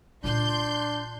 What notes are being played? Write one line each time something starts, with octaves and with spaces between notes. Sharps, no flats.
A#2 D4 F4 C6 G6